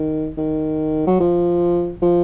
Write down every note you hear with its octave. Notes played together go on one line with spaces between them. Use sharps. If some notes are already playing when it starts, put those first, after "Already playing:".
Already playing: D#3
D#3
F#3
F3
F3